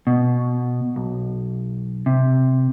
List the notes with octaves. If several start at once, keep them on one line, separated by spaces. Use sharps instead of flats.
B2
B1
C3